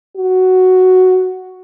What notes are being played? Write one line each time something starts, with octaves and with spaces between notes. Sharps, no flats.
F#4